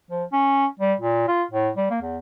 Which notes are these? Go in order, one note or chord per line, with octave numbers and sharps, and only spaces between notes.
F3
C#4
G3
A#2
F4
A2
G3
A#3
E2